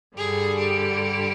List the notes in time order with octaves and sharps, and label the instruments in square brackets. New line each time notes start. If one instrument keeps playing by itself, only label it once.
[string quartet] G2 D3 G3 G#4
G4